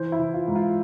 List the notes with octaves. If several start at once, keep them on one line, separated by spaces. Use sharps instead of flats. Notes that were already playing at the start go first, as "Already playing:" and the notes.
Already playing: E3 C5
E4
E3
F4
G#2
F4